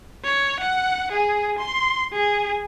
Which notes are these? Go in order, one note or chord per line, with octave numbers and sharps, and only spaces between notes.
C#5
F#5
G#4
C6
G#4